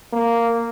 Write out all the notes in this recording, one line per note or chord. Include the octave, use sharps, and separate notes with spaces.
A#3